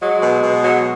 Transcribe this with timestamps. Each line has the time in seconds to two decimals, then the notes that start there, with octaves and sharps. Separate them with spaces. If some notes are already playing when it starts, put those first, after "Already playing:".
0.01 F#3 G#3
0.22 B2
0.43 B2
0.63 F#3